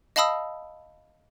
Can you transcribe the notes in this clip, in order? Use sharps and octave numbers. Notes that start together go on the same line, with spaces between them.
D#5 F5 A5 B5 D#6 E6